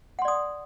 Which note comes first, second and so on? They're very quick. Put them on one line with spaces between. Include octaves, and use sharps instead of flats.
F#5 C6 D5 D#6